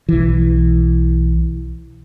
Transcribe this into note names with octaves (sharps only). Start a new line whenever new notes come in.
B1 E3